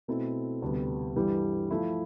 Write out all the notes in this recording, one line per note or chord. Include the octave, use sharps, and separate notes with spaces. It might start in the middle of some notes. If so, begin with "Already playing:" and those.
B2 A3 C4 E4 A4
D2 C3 G3 B3
G2 E3 G3
F3 A3 E4